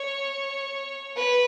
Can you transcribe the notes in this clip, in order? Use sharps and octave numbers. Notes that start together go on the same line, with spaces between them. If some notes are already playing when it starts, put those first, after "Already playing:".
Already playing: C#5
B4